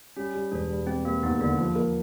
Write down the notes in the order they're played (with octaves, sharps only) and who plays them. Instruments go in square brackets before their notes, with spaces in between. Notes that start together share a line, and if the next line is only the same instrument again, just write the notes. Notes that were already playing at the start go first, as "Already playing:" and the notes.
[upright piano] G3 [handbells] C#4
[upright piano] G3
[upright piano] E1 [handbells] D4
[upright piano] G3
[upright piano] G3 [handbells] C4
[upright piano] G3 [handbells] A#3
[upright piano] D#2 [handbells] B3
[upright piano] D3 [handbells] A#3
[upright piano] F3
A#3